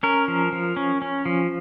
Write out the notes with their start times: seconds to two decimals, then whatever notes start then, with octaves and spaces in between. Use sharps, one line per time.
0.03 C#4 A#4
0.28 F3
0.52 F3
0.77 C#4
1.02 C#4
1.26 F3